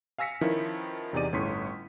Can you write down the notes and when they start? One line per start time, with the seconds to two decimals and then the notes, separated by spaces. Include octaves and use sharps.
0.18 F5 G#5 E6 A#6 B6 C#7
0.41 D#3 F3 C#4 E4 B4
1.13 E2 C3 D#4 G#4 D5 D#7
1.32 G1 A2 C#4 C6 C#6 B6